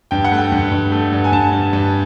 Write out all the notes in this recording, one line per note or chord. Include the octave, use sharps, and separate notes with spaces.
G2 G5
F#5
A3
G5
G2
G2
A3
G2
G#5
G2 A5
G2
G2